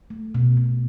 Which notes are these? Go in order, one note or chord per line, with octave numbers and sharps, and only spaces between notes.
A3
B2
B2